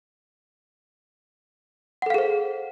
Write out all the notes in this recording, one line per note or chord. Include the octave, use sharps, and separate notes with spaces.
G#4 A4 C5 F5 F#5